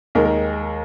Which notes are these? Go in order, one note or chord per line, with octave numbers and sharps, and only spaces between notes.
D#2 D#3 G#3 A#4
A#4